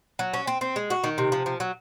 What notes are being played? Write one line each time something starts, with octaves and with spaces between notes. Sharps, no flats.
F#3
C#4
C4
C4
G#3
F#4
D#3
C3
F3
F3
F#3